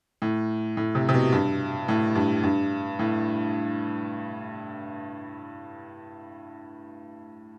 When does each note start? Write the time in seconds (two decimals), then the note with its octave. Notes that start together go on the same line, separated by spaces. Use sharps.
0.22 A2
0.77 A2
0.95 C3
1.09 C3
1.14 B2
1.32 G2
1.88 A2
2.15 G2
2.43 G2
2.99 A2